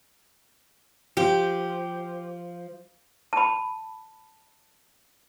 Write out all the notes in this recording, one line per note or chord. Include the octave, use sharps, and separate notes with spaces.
F3 G4
A5 B5